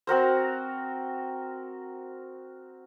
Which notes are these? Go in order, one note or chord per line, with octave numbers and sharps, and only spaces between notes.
C4 F#4 A#4 C5